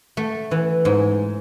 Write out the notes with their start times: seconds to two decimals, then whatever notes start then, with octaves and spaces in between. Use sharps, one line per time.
0.17 A3
0.51 E3
0.85 G#2